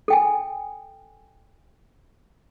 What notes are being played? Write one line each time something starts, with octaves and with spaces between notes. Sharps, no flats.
A4 G5 G#5